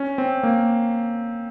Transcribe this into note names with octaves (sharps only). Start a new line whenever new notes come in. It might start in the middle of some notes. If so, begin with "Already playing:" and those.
Already playing: C#4
C4
A#3